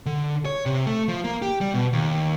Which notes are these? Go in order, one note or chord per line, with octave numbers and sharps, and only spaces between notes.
D3
C#5
C3
A3
F3
A#3
G4
G3
B2
D#2